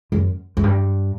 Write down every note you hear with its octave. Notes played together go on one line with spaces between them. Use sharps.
F#2
F#2
G2